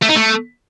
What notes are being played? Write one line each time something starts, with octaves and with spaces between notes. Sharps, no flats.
A3
D#4
A3